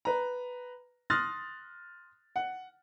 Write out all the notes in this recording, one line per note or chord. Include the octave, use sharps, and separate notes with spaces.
B4 A#5
C6 D#6 F6 F#6 A6 A#6
F#5